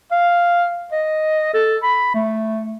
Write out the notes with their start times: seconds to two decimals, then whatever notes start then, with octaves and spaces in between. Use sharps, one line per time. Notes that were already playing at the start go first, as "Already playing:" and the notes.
0.12 F5
0.92 D#5
1.54 A4
1.83 B5
2.14 A3